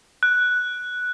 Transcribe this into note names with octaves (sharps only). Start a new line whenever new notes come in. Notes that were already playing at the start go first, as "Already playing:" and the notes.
F#6